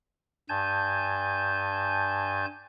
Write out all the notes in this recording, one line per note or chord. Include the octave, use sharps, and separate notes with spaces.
G2 G#5 A5 G6